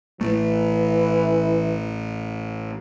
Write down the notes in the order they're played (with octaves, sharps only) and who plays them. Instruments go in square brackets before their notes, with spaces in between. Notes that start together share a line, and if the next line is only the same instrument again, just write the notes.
[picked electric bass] A1 A3 [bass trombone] E3